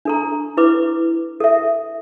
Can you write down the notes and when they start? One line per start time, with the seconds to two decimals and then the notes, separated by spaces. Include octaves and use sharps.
0.05 D4 A4 A#5
0.57 E4 B4 D6
1.40 A4 E5